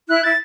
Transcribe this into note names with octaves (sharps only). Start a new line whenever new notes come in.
E4 F#6
E4 A6